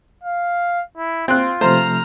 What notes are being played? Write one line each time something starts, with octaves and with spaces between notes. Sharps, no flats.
F5
E4
C4 F4 F#6
C3 F3 A3 C5 A#5 F6